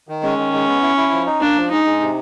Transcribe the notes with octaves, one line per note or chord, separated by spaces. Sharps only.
D#3
G#3 C#4
D#3
G#3
B3
E4
E4
F3
D#4
A#3 D4
F3
G#3 D#4
G#3
C3